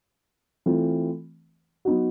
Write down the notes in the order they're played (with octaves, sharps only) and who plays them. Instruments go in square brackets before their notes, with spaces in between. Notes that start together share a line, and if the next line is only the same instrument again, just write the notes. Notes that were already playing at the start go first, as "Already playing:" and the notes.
[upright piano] E3 A3 C4 F4
F#3 B3 D#4 F#4